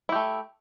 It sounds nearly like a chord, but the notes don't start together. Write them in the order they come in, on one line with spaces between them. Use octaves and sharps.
E4 G4 A3